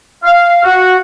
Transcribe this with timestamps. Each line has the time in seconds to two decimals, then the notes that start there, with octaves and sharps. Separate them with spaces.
0.24 F5
0.64 F#4